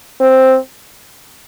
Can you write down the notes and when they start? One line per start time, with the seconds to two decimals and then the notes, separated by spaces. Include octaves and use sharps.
0.21 C4